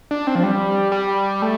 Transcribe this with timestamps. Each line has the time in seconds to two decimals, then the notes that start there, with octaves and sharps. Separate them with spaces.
0.11 D4
0.27 C4
0.35 F3
0.43 G3
0.92 G3
1.42 A3